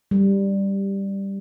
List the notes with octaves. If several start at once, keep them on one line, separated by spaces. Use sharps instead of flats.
G3